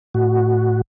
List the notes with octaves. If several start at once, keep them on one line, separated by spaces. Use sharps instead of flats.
A2 F#4